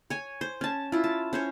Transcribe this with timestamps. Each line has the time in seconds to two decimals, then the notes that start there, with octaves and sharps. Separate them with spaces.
0.10 C#5 G#5
0.41 C5
0.61 C#4 A5
0.92 E4 F4
1.04 A5
1.33 C#4 C5 C#5